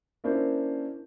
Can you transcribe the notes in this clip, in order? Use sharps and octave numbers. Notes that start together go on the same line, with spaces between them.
A#3 C#4 D4 E4 A#4 C5